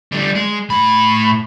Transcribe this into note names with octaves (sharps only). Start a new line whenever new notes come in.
D3 G3
G#3
A2 B5